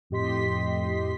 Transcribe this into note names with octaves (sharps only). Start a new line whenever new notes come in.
F2 A2 G4 D#5 C6 B6